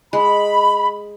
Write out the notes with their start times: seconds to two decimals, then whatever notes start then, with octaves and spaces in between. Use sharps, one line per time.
0.13 G#3 B5